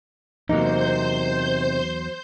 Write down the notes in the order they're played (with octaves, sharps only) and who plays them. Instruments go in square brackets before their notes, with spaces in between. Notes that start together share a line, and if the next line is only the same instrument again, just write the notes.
[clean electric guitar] E2 F#3 [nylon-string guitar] C3 A#3 D#4 [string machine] C5 G6